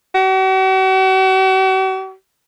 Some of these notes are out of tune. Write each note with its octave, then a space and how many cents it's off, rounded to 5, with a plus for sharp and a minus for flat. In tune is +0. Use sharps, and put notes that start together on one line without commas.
F#4 +45